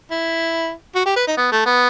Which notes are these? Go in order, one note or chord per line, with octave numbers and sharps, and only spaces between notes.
E4
F#4
G4
B4
D#4
B3
A3
B3